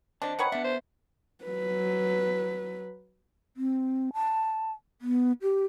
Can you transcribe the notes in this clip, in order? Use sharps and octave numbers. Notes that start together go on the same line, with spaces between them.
D4 C5 D#5 A5
D#3 B4 C#5 F#5
B3 D4 E5
C5
F#3 B4
C4
A5
B3
G4